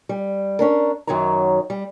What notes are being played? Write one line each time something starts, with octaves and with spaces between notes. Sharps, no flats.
G3
C#4 D4 A#4
F#2 D#3 F#3 C#5 F#5 A#5
G3